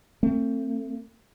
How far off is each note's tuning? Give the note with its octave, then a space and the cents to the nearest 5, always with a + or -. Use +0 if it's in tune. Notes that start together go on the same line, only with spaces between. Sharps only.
A3 +35 C4 +20